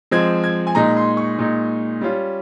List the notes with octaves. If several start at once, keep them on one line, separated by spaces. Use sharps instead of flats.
F3 G#3 C4 G#6
G#6
G#5
A#2 G#3 D#4 A#5
C6
C#6
A#2 G#3 D#4
G3 C#4 F4